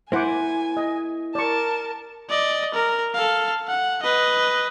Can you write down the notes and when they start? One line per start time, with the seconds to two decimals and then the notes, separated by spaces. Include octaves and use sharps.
0.12 A#3 E4 C5 F#5 G#5 D6
0.77 D#5
1.35 A#4 D5 A5 C#6
2.30 D5 D#5
2.74 A#4
3.15 A4 F5
3.68 F#5
4.03 B4 D#5